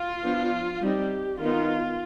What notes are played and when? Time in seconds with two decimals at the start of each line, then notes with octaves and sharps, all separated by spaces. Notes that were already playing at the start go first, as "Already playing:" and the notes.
Already playing: F4
0.23 F3 B3 D4
0.81 G3 C4 D#4 G4
1.40 D#3 B3 D#4 F4